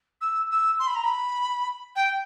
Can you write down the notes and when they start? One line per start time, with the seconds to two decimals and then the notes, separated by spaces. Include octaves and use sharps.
0.21 E6
0.51 E6
0.79 C6
0.87 B5
0.95 A#5
1.04 B5
1.96 G5